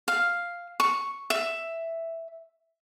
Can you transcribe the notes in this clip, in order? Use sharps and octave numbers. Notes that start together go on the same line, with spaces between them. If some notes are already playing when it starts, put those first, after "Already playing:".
F5
C#6
E5